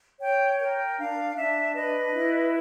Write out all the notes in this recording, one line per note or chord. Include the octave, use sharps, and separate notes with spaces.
C#5 G5
A#4 G5
D4 F5
D4 E5
B4 D#5
E4